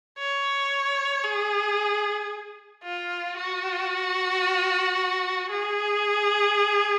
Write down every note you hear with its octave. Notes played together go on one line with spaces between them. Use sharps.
C#5
G#4
F4
F#4
G#4